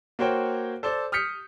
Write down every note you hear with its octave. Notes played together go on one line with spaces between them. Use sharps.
A#3 F#4 C5 C#5 G5
A4 C5 D5
D#6 F6 G6 B6 C#7